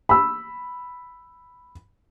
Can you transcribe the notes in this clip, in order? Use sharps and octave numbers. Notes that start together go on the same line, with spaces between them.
B5 E6